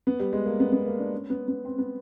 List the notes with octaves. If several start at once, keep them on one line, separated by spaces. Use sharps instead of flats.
B3
G3
G#3
A#3
B3
B3
A#3
D4
C#4
B3
B3
C4
B3